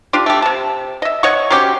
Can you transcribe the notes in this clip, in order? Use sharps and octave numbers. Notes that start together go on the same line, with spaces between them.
D4 F4 G4
A3 G4
C3 A5
D#5 E5
C#5 D#5 F#5 C#6
F#3 C4 C#4 G4